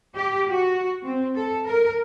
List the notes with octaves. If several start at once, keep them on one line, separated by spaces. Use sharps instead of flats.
G4
F#4
C4
A4
A#4